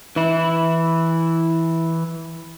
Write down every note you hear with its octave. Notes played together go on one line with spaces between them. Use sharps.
E3 E4